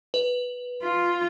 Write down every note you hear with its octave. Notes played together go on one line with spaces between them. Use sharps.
B4
F4